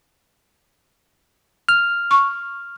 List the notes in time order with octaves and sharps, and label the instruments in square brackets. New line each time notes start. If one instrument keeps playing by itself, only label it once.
[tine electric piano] F6
[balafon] C#6